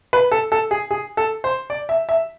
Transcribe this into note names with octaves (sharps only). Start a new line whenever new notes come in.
B4
A4
A4
G#4
G#4
A4
C5
D5
E5
E5